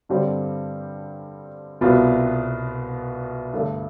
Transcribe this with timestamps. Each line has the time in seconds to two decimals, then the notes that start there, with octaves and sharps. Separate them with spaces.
0.09 G2 D3 G3 C4 G4
1.81 C2 B2 B3 F4
3.53 G2 D3 A3